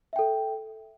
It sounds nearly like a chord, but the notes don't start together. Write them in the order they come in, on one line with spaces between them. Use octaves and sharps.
E5 G5 A4